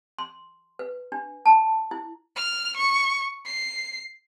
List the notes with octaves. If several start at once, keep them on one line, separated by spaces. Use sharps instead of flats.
C6
B4
D4
A5
E4
F6
C#6
C7